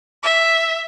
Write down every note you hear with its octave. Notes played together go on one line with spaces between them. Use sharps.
E5